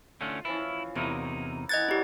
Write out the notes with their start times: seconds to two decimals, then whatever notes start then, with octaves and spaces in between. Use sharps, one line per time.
0.21 D3 A3 C#4 F4
0.45 E3 F3 C#4 E4
0.95 E2 C3 A3 A#3 D#4 E4
1.69 E3 D#5 F#5 G#6 A6
1.89 F#3 D4 E4 G4